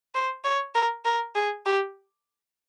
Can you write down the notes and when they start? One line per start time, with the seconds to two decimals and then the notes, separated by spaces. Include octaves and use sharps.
0.15 C5
0.44 C#5
0.75 A#4
1.05 A#4
1.35 G#4
1.66 G4